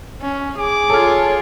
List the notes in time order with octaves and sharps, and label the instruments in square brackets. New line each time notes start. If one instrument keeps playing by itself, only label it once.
[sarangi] C#4
[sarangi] G#4 [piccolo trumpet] D6
[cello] F4 C#5 [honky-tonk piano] A4 F6